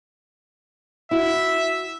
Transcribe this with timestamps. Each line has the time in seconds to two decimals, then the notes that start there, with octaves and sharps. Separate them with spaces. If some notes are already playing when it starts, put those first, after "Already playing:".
1.11 E4 F#4 E5